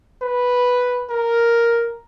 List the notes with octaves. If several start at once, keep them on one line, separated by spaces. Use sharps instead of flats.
B4
A#4